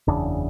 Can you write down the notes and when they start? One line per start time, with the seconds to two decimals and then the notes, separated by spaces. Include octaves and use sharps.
0.07 F#1 E2 C#3 D4